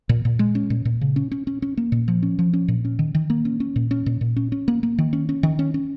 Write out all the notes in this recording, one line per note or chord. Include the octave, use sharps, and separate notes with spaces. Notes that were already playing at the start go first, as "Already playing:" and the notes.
A#2
A#2
G#3
C#4
A#2
A#2
C#3
C#4
C#4
C#4
C#4
A#3
A#2
F3
C#4
F3
C#4
A#2
C#4
D#3
D#3
A#3
C#4
C#4
A#2
C#4
A#2
A#2
C#4
C#4
A#3
A#3
D#3
C#4
C#4
D#3
C#4
C#4